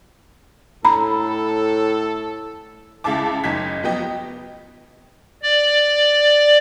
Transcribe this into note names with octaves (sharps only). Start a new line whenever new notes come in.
A2 A4 A#5 B5
C#2 C#3 E4 E5 A5 D6
F#1 D#4 G#6 B6
F3 F#3 B3 G4 D#5
D5